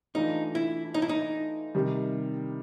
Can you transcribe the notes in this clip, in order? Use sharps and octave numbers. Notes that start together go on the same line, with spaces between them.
E3 A3 D4 D#4 F4
E4
D#4
E4
D#4
C3 D#3 G3